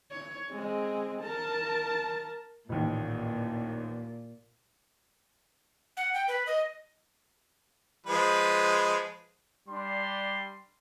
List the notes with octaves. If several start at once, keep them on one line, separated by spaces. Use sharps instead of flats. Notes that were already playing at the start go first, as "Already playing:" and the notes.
C#5
G#3 C4
A#4 A5
A1 D#2 A#2
F#5
G5
B4
D#5
F3 G#3 B4
G3 D4 C6